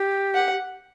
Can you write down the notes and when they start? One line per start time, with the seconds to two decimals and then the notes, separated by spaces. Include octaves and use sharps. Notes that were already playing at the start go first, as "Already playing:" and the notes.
Already playing: G4
0.35 F#5